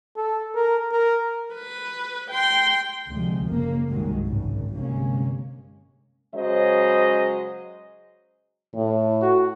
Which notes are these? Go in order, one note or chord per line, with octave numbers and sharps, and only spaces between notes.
A4
A#4
A#4
B4
G5 C6
D2 C3 F3 G#3
F#1 C#3 A#3
C2 G2 D#3 F#3 G#3
G#1 F#2 C#3
G1 C3 G#3 A#3 C#4
C#3 F#3 G#3 C5 D#5
A2
F#4